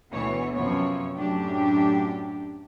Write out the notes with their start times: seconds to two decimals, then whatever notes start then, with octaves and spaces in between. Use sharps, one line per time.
0.11 D2 B2 E3 B3 C#5
0.54 F#2 C3 F3 B3 C#5
1.17 F#2 A2 F#3 D4 G4